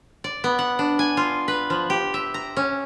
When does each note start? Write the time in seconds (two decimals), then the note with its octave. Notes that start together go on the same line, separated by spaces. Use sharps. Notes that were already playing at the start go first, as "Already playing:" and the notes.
0.24 D5
0.44 B3
0.59 F#5
0.79 D4
0.99 G#5
1.17 F4
1.48 B4
1.70 F3
1.90 G4
2.14 E5
2.34 A#5
2.57 C#4